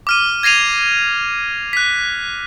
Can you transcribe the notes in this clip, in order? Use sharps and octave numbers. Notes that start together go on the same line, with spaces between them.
D6 F6 D#7
G#6 A#6 C7 D#7 F7
F#6 B6